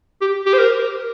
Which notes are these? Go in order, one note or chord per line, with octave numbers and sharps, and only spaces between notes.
G4
G4
C5
A#4